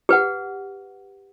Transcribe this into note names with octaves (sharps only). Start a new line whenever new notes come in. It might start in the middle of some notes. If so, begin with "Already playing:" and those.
G4 B4 F#5